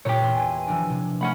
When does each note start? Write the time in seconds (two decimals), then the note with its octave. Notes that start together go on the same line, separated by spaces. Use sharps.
0.05 A#2 C#4 G4 C#5
0.22 E2 C6
0.34 G#5
0.67 E3 F3 D4
0.90 C3
1.21 A3 C#4 F#5 B5